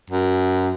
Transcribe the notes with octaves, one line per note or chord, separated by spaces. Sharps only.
F#2